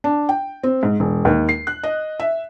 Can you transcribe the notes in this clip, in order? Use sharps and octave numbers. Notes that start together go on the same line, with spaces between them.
D4
G5
C4
G#2
E1
D#2
C7
F#6
D#5
E5